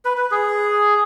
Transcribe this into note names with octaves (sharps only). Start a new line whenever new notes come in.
B4
B4
G#4